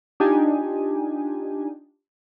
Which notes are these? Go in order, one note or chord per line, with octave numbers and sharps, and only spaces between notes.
D4 D#4 F4 G4 G#5